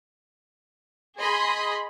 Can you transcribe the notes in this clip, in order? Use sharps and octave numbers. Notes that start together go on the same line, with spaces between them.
G#4 D#5 B5 C6